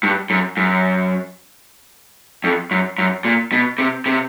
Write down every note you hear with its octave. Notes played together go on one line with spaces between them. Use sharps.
G2
F#2
F#2
F2
F#2
F#2
A#2
B2
C3
C3